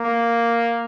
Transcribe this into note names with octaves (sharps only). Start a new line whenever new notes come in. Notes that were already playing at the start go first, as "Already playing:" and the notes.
Already playing: A#3